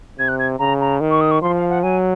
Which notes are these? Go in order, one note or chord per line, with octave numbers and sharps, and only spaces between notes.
C3 G#6
F#6
G#6
C#3 A#5
A#5
D#3
C#6
D#6
C#6
F3 C6
F5
F#5
F#3 G#5